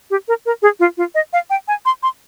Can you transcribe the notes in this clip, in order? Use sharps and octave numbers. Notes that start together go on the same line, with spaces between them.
G4
A#4
A#4
G#4
F4
F4
D#5
F5
G5
G#5
C6
C6